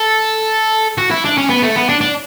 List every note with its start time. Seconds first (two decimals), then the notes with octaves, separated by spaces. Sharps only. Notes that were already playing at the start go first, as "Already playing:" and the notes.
Already playing: A4
0.98 F#4
1.11 E4
1.24 D4
1.37 C#4
1.49 B3
1.62 A3
1.76 B3
1.89 D4
2.01 D4